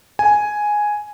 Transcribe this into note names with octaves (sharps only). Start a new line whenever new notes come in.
G#5